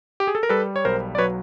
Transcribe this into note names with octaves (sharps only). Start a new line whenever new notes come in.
G4
G#4
A4
A#4
G3 A4 B4
C#5
B1 A#4 C5
D5
F#3 B4 C#5